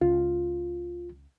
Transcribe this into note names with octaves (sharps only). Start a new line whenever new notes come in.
C#2 F4